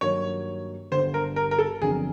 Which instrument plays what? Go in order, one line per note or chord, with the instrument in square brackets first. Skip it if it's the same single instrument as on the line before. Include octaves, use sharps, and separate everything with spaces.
[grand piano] G2 D#3 F#3 A#3 [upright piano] C#5
[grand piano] G1 G2 D3 G3 [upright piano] C5
[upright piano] A#4
A#4
A#4
A4
[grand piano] G1 F2 D3 F#3 [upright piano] G#4